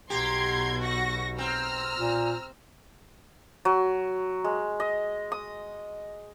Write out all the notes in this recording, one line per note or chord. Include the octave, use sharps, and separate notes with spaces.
B1 B2 G4 A#5 C6 G#6
F#4 C#6 A#6
C4 A#5 E6 F6
A#2
F#3
G#3
D#5
D#6